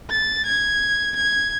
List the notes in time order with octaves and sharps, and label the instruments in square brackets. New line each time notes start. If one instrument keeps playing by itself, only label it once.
[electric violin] A6
G#6
G#6